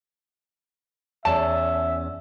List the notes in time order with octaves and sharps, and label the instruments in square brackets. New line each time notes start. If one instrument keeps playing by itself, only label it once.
[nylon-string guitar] E2 C#4 D5 [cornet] E5 [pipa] A5